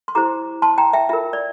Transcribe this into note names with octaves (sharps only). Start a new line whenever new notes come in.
C6
E4 G4 C5 A#5 D6
A5 C6
G5 A#5
E5 G5
F4 A#4 E5
D5